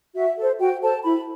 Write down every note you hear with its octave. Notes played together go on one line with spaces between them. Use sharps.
F#4 E5
A4 C5
F#4 G5
A4 C5 A5
E4 B5